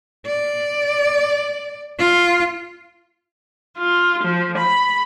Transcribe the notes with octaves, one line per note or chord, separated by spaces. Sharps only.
D5
F4
F4
F3
B5